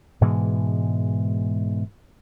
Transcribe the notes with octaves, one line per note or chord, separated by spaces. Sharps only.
G#2 B2 E3 G#3